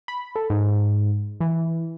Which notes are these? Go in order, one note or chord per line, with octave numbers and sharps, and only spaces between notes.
B5
A4
G#2
E3